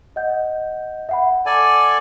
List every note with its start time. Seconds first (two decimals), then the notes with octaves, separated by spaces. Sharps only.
0.16 D#5 F#5 G6
1.09 E5 F#5 B5
1.46 A4 D5 G#5